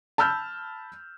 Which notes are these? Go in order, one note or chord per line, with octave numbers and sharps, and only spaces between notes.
A5 B5 E6 F6 G6